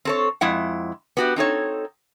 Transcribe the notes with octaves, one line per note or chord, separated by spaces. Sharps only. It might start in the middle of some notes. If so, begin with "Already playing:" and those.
C4 A4 C#5
F2 G#3 E4 F#5
B3 F#4 G4
C4 D#4 A4 C#5